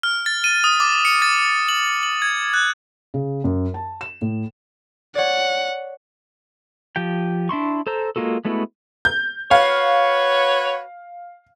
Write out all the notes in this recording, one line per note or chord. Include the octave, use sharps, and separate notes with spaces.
F6
A6
D#7
D#6
D6
C#7
A6
F#7
F#7
G#6
F#6
C#3
F#2
A5
E7
A2
C#5 D5 F#5
F3 G4 G5
D4 E4 C6 C#6
A4 C5 A#5 E6
G#3 A#3 F4 F#4 A4
G#3 A3 B3 E4 F#4
G6
F#4 B4 C#5 F5